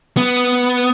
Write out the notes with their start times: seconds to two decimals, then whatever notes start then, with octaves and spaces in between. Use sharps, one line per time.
0.17 B3